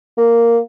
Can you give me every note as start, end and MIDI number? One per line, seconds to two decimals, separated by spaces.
0.17 0.58 58